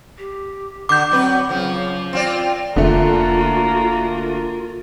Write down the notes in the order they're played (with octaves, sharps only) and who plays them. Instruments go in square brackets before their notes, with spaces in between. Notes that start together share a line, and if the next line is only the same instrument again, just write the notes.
[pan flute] G4
[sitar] D3 [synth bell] D6 G6
[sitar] F#3 B4 [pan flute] C4
[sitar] C#3 F3 [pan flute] F#3
[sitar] C4 F4 D5
[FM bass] F1 [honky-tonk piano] D3 A3 [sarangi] A#3 [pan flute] F4